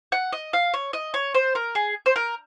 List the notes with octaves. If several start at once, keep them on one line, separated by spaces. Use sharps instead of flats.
F#5
D#5
F5
C#5
D#5
C#5
C5
A#4
G#4
C5
A#4